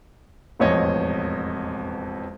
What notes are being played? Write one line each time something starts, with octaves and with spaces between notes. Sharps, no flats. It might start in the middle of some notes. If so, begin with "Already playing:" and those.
E1 A1 F2 C#5 D#5